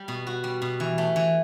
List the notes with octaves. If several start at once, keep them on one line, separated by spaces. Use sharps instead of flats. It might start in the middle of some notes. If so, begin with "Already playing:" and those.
Already playing: G3
B2
F#4
G3
B2
E3
A3
E3